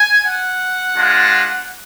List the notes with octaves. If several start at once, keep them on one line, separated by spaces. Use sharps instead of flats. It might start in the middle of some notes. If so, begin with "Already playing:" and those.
Already playing: G#5
F#5
G#3 D4 F4